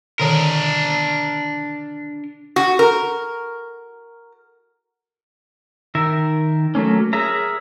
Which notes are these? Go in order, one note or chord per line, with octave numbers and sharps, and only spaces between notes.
B2 D3 D#3 D4 A#4
F#4
A#4
D#3 A#4 E5
F#3 A3 A#3 C#4
G#4 A#4 C#5 E5 A#5